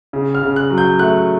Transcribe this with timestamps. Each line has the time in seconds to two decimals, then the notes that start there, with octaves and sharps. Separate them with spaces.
0.13 C#3
0.35 F6
0.43 C#3
0.56 F#6
0.70 F#3
0.78 G6
0.99 A3 F#6